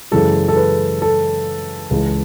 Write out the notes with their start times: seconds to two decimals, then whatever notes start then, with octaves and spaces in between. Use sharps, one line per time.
0.11 F#2 C#3 E3 G#3 A4
0.48 A4
0.56 B4
1.02 A4
1.91 C#2 C#3 E3 G#3